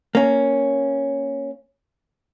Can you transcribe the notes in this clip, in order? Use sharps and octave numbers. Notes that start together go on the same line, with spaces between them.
A#3 C#4